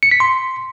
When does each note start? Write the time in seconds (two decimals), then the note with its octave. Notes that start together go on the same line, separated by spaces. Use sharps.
0.03 C#7
0.11 B6
0.20 C6